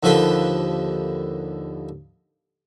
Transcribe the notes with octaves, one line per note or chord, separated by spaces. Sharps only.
D#2 D3 F3 A4 B4 C6